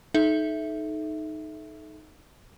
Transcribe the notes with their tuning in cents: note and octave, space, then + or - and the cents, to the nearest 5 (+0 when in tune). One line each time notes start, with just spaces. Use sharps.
D#4 +0 A4 -30 E5 +0